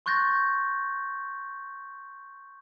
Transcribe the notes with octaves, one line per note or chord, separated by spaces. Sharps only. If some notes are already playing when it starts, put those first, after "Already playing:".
C6 C#6 F#6 G6 A6 A#6